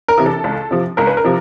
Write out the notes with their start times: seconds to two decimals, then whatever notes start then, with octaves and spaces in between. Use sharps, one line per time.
0.08 A#4
0.18 C3 E3
0.26 A4
0.44 C#2
0.71 C3 F3
0.97 C#2 A#4
1.07 B4
1.17 A#4
1.24 C3 F3